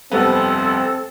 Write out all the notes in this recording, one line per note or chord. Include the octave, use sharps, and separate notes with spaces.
F1 G2 B3 C4 A4